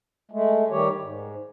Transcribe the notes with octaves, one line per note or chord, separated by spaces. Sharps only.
G#3 A3
D#3 G3 G4 C#5
G#2